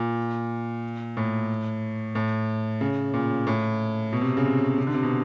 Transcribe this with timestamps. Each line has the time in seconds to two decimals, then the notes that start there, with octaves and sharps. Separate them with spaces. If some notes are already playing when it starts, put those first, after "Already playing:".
Already playing: A#2
1.17 A2
2.15 A2
2.81 C#3
3.14 A#2
3.47 A2
4.13 B2
4.21 C3
4.37 C#3
4.46 C3
4.78 C3
4.87 D3
4.94 C3
5.03 B2